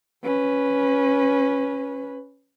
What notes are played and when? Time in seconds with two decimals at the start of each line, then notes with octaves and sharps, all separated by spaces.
0.23 C#4 B4